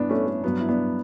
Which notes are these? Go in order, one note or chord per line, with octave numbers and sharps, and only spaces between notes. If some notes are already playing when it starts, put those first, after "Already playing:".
Already playing: G2 E3 B3 D4
A3 C#4
A3
G2 F#3 B3
E4
B3 D4